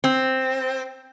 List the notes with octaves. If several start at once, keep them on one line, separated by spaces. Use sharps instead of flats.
C4